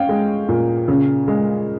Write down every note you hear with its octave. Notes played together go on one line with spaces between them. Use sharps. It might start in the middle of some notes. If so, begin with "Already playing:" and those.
Already playing: C#4 F5 G5
G#3
A#2
C#3
G#3